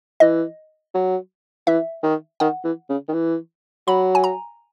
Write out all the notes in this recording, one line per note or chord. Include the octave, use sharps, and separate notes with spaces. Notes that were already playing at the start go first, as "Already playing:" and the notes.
E3 D#5
F#3
E3 E5
D#3
D#3 F#5
E3
C#3
D#3
E3
F#3 B5
G#5
A#5